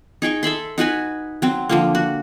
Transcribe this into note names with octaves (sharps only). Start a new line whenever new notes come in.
D#4 G#4 G5 C#6
A4 E5 B5 C6
D#4 F#4 B4 G#5
F#3 C4
D3 F3 A#3
F#4